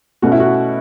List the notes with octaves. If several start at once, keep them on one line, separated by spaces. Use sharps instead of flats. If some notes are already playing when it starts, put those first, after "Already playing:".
B2 A3 C#4 F#4
E4
F#4